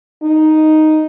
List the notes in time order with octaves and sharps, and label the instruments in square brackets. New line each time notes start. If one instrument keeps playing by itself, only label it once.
[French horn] D#4